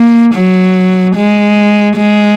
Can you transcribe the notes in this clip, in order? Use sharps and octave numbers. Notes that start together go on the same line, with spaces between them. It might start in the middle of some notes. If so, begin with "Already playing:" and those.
Already playing: A#3
F#3
G#3
G#3